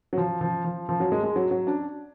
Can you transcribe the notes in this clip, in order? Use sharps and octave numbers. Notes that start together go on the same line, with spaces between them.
F#3
F3
F3
F3
F3
F#3
G#3
G#3
F#3
F#3
D4